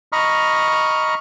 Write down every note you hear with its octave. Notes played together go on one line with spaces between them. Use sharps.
D#5 A#5 B5 C#6 F6